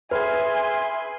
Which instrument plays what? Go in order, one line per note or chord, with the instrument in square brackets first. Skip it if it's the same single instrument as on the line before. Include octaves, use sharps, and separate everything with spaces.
[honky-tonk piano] G#4 F6 [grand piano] B4 [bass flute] E5 [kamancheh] G#5 C6